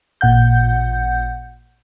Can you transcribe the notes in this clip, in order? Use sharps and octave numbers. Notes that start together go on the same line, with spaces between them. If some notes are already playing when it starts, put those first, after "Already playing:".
A1 A#2 F#5 G6